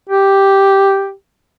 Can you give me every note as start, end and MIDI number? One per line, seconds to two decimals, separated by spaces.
0.10 1.12 67